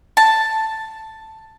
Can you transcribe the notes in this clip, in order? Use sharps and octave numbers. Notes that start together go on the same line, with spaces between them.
A5